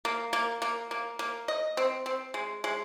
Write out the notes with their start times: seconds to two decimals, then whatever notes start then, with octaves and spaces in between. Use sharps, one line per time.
0.05 A#3
0.33 A#3
0.62 A#3
0.91 A#3
1.19 A#3
1.48 D#5
1.77 C4
2.06 C4
2.34 G#3
2.64 G#3